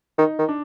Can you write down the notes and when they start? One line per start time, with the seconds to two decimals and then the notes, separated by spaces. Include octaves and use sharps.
0.18 D#3 D#4
0.39 D#3
0.48 D4